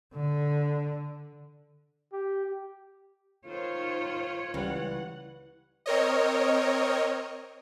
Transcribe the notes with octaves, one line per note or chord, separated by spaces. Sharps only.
D3
G4
D#3 F4 C5 C#5
C#2 E3 G3 F#5
C4 A#4 C#5 D#5